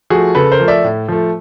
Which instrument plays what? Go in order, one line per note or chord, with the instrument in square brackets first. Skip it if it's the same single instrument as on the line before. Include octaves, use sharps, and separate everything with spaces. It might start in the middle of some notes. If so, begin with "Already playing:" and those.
[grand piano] F3 A3 F#4 G#4
C#3 A4 B4
A#4 C5
F3 A3
D5 E5
A2
F3 A3